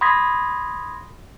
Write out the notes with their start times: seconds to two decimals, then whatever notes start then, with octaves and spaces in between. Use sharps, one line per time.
0.01 B5 C6 D#6 G#6 A#6 B6